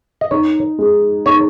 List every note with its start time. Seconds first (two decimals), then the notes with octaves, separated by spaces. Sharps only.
0.21 D#5
0.31 D#4 C#5
0.79 G#3
1.26 D#4 C#5